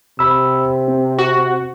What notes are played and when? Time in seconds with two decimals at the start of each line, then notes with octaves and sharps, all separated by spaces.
0.19 C3 B5 E6
0.88 C4
1.18 F#4